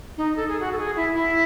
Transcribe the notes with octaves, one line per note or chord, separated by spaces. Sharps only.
D#4
A4
G#4
F#4
A4
G#4
E4
E4